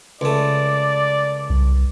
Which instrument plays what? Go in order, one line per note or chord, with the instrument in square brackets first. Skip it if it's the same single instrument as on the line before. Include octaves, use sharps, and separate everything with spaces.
[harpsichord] C#2 A3 [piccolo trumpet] D5
[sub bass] C2